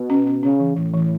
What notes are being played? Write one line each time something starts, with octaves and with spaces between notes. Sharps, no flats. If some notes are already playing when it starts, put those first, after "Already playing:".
Already playing: B2
C#4
C#4
C#3 C#4
E3
A2 E3
E3